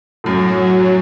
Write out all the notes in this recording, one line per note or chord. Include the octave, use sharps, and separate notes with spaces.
F#2 A2 F#3